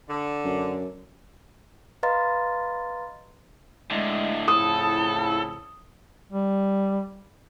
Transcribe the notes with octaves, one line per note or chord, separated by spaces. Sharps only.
D3
F#2
B4 D#5 F5 A#5 C6 A6
A2 D3 G#3
F2 A2 C#3 E4 A4 D#6
G3